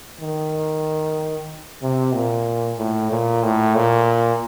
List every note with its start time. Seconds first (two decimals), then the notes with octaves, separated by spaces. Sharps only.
0.21 D#3
1.82 C3
2.14 A#2
2.78 A2
3.11 A#2
3.43 A2
3.75 A#2